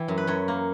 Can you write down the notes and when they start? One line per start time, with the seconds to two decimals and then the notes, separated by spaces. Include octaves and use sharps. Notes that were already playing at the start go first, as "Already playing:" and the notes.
Already playing: E3 G5
0.08 F#2
0.18 B4
0.27 F#2 C#5
0.48 A#3